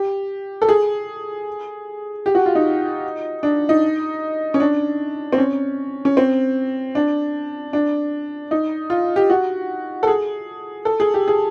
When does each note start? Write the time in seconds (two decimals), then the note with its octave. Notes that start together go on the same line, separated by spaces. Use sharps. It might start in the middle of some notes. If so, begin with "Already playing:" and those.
Already playing: G4
0.62 A4
0.69 G#4
2.26 G4
2.35 F#4
2.46 F4
2.55 D#4
3.43 D4
3.69 D#4
4.54 C#4
4.60 D4
5.32 C4
5.38 C#4
6.05 C#4
6.17 C4
6.95 D4
7.73 D4
8.51 D#4
8.90 F4
9.16 G4
9.30 F#4
10.03 A4
10.07 G#4
10.85 A4
11.00 G#4
11.14 G4
11.28 G#4